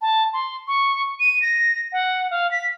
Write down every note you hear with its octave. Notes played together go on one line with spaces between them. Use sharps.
A5
C6
C#6
D#7
A#6
F#5
F5
B6